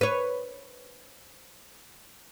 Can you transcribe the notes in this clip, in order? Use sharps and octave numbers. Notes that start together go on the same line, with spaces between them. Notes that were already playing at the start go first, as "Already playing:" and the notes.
B4 C#5